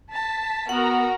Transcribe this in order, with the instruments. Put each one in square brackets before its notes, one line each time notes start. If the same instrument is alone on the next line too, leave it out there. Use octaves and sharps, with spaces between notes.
[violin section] A5 B6
[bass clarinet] B3 [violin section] F#4 A#4 A#5 [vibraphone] F#5